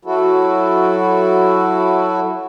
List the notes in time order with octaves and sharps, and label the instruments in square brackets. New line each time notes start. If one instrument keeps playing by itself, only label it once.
[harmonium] F#3 E4 F#4 A4